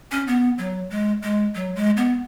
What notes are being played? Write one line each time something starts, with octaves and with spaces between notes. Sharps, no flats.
C#4
B3
F#3
G#3
G#3
F#3
G#3
B3